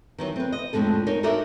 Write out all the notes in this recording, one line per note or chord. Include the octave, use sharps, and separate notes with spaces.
D#3 E3 F#3
C4 B4
D#5
F2 A2 G#3 D4 A4
D#4 A#4 C#5
D#4 F#4 A4 A#4 D5 E5